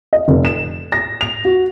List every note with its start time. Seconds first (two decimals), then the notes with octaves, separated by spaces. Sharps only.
0.13 D#5
0.28 F1
0.45 E7
0.92 A#6
1.21 F7
1.45 F#4